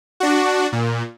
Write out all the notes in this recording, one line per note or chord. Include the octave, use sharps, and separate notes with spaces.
D4 F#4
A#2